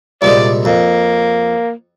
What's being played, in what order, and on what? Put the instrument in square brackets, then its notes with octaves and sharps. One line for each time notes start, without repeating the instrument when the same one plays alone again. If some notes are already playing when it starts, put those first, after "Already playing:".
[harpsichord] C2 A#2 G#3 [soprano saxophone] D5
[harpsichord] F2 [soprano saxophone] A#3